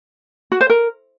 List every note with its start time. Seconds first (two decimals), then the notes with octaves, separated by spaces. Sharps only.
0.52 F#4
0.61 C5
0.70 A#4